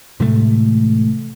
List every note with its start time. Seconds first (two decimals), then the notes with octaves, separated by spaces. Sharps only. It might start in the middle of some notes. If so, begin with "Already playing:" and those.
0.20 A1 C3 G#3 A3